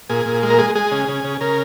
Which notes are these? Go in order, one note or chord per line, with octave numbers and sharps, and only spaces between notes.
A#2 G#4
A#2
G#3
A#4
G#3 G#4
G#3 G#4
C#3
C#3
C#3
C#3 A#4